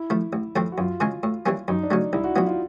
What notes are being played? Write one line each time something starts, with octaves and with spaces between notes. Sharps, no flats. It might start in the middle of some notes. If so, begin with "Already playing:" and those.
Already playing: E4
F3 A3
A1
A2 F3 A3 C4
F#4
F#2 F4
C#3 E3 G#3 C#4
A2
E3 G3 A#3 C#4
F#2 D#4
D4
C#3 F#3 A3
C2 E4
F#4
B2 F#3 B3 F4
F4